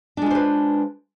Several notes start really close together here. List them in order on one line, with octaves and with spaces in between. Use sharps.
D4 G#3 F4 C5 B4